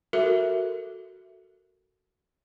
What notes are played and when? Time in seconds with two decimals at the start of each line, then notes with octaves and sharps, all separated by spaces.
0.13 F#4 A4 A#4 E5